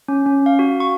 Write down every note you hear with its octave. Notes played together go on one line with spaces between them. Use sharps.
C#4
C#4
F5
F#4
C#6